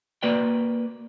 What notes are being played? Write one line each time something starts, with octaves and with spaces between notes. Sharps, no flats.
A#3 F#4 B4 D5 G5